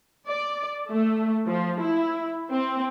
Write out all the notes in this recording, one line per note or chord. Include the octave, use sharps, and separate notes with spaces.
D5
A3
F3
E4
C4